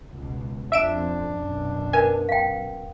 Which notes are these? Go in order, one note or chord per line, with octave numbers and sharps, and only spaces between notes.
C#2 B2
F2 D4 E5 D7 E7
F#2 B2
A#4 B4 G#5
F5 G5